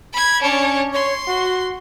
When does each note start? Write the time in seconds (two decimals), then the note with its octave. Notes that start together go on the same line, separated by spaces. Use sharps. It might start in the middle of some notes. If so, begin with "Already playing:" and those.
0.13 B5 G#6
0.42 C#4 D4 C#5
0.93 C#5 C6
1.28 F#4